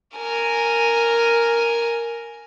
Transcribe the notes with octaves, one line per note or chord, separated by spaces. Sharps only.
A#4 G#5